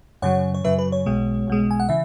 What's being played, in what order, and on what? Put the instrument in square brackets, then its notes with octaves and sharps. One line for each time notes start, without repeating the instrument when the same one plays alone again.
[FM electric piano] F#2 C#3 F#3 C#5 F#5
C#5
F#2 C#3 F#3 B4 E5
B4
C#5
B1 B2 G#3
B1 B2 G#3
G#5
F#5
C#3 E3 E5